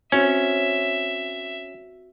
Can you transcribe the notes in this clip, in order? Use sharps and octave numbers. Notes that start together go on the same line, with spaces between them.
C4 C#4 F#4 C#5 E5